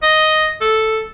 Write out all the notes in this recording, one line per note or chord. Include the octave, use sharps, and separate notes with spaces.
D#5
A4